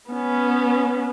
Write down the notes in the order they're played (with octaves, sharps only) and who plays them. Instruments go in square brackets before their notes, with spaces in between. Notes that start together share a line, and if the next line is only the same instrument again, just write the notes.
[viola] B3 C#4